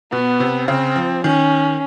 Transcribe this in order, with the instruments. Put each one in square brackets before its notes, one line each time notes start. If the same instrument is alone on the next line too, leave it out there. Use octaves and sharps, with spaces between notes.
[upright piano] B2 [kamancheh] B3
[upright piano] C3
[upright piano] C#3 [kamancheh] C4
[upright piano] F3
[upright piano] D#3 [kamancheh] C#4